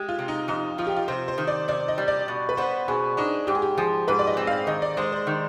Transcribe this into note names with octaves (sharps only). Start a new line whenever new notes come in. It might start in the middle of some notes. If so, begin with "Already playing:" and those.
Already playing: G#3 G4
F4
C3
D#4
F2 D#4
F3 F4
G4
F4
C3 C5
C5
D#3
D5
C3 D5
D#5
G3
D5
B2
B4
B3 C5
B2 G#4
D4 D#4
G#2 G4
G#4
G4
F3 G#4
G#2 B4
D5
D#5
C4
F5
D#3 D#5
D5
G#3 C5
C5
D#3